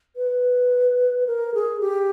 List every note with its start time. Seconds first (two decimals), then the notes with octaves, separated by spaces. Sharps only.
0.16 B4
1.27 A#4
1.54 G#4
1.81 G4